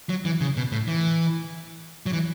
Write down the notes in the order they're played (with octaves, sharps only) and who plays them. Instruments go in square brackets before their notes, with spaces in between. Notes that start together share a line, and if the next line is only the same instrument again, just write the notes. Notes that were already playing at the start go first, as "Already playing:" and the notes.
[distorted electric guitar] F#3
E3
C#3
B2
A2
E3
F#3
E3